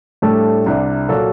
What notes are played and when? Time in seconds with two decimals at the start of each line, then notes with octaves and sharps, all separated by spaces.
0.22 A2 G3 A3 D4 A4
0.66 C2 C3 G3 D4
1.09 A#2 F#3 A#3 F#4 A4